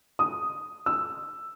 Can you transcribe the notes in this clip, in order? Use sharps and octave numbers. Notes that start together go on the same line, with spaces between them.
D#6
E6